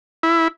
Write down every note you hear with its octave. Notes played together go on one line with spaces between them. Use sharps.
E4